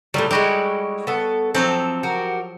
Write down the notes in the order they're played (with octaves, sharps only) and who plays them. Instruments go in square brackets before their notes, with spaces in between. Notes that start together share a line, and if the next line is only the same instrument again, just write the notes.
[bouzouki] A2 D#3 G3 [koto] F#3
[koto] G3 F#4 [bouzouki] G#3 E4
[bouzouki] B3 A4
[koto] F3 F#3 A4 [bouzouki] C4
[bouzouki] F#4 G4 A#4